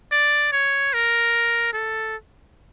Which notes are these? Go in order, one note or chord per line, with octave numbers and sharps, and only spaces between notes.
D5
C#5
A#4
A4